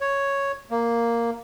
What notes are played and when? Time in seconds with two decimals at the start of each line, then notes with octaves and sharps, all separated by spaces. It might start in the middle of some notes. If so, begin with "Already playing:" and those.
0.01 C#5
0.71 A#3